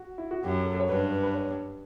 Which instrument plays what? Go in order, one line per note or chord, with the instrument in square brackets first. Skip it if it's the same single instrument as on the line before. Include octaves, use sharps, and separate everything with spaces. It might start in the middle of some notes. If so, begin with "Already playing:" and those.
Already playing: [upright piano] F#4
E4
F#4
[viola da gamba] F#2 [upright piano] G4
[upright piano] A4
C#5
[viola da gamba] G2 [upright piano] B4
[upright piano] B4
C#5